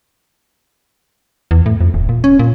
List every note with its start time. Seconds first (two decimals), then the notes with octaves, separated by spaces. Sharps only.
1.51 E2
1.66 A2
1.81 F2
1.94 D#1
2.09 A#2
2.24 C#4
2.39 A#2